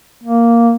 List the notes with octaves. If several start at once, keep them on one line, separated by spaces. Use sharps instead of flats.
A#3